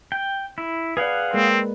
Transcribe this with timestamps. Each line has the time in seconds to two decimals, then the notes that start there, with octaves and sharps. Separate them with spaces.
0.12 G5
0.58 E4
0.97 G#4 B4 D5 F5 F#5
1.33 G#3 A#3 C4 A#4